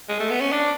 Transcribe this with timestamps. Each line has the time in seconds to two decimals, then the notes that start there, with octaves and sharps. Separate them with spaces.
0.09 G#3
0.20 A3
0.30 B3
0.40 C#4
0.52 D4